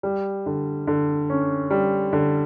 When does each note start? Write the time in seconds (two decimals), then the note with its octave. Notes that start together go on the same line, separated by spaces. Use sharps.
0.03 G3
0.46 D3
0.87 D3
1.30 C#4
1.70 G3
2.13 D3